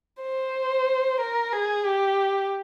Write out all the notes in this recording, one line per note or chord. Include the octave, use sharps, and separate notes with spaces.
C5
A#4
G#4
G4